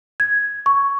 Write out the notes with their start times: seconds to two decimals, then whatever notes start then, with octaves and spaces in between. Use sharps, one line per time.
0.20 G#6
0.66 C#6